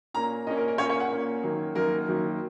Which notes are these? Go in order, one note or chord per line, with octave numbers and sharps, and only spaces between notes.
A#2 A#3 C#4 A#5
A#2 A#3 C#4 D#5
A#4
A#4
A#2 A#3 C#4 C#5
C#5
F#5
A#2 A#3 C#4
F#2 D#3 F#3 A#3
F#2 D#3 F#3 A#3 A#4
F#2 D#3 F#3 A#3